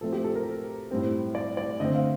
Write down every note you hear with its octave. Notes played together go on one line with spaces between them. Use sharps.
A#2 F3 A3 C4 A4
G4
A4
A#4
A2 G3 C4
D5
D5
D3 A3 C4 D#5
F5